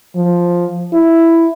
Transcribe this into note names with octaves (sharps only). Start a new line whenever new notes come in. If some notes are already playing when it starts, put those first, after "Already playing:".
F3
E4